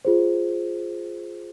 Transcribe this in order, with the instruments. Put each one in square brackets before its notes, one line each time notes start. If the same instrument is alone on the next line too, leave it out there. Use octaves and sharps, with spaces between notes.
[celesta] F4 G#4 C5